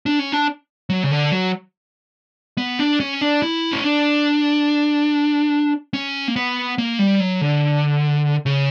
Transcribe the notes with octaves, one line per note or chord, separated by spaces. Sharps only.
D4
C#4
D4
F#3
C#3
D3
F#3
B3
D4
C#4
D4
E4
C#4
D4
C#4
A#3
B3
A#3
G3
F#3
D3
C#3